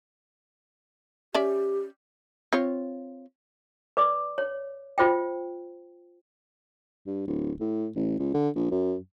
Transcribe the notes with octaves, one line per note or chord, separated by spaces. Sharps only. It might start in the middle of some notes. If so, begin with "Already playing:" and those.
C#4 G4 D5 E5
C4 F4 C#5
B4 D5 D6
C#5
F4 C5 D#5 G5
G2
D1
A2
A1
C#2
D3
A#1
F#2